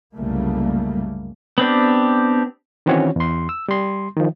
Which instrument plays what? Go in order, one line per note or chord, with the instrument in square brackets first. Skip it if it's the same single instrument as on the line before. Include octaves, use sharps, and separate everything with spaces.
[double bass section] C2 F#2 C#3 G3 A3 A#3
[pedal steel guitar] B3 C4 D4 G4
[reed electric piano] D#3 E3 C4 C#4 F#4 C#5
E2 C6
E6
G3 C6
D#3 F3